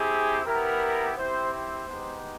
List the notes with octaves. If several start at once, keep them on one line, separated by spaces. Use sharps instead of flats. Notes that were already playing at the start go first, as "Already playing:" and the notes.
Already playing: C4 E4 G4 G#4
B3 E4 G4 A#4
C4 E4 G4 C5
C5
G#3 B3 D#4 G4